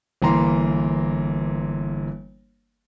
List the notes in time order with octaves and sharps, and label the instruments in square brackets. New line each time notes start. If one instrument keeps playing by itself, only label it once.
[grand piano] G1 E3 A#3 A#5 C6